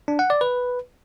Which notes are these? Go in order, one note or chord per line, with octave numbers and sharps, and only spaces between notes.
D4
F#5
D5
B4